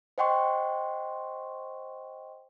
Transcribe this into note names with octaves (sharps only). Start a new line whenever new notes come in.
C5 D#5 F#5 G5 C6 C#6